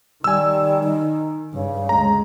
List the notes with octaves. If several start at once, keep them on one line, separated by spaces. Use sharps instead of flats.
D#3 G3 G#5 E6
D#4
G2 C#3
D2 G#3 A#5